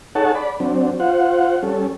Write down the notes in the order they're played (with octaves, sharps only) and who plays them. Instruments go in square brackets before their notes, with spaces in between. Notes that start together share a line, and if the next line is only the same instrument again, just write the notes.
[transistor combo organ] D#4 G#4 A4 C#5 F#5 A5
D5 B5
F#3 C4 D4
F4 C5 F#5
G3 C#4 A4